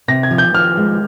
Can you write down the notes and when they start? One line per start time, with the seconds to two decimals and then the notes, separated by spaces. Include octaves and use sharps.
0.08 C3 A#6
0.23 G#6
0.31 F3
0.38 G6
0.54 F3 F6
0.77 G#3